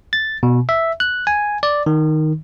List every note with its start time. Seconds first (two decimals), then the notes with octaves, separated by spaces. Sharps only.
0.13 A6
0.43 B2
0.69 E5
1.00 F#6
1.27 G#5
1.63 D5
1.86 D#3